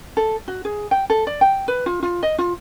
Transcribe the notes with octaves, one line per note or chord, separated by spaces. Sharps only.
A4
F#4
G#4
G5
A4
D5
G5
B4
F4
F4
D#5
F4